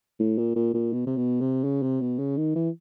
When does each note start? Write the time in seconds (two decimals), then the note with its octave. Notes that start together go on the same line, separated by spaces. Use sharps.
0.20 A2
0.38 A#2
0.56 A#2
0.74 A#2
0.93 B2
1.07 C3
1.17 B2
1.41 C3
1.64 C#3
1.83 C3
2.01 B2
2.19 C#3
2.37 D#3
2.56 E3